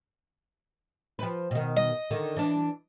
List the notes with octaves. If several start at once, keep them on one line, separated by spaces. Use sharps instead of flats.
F3 B4
B2 D#3
D#5
D3 D#3
E3 D4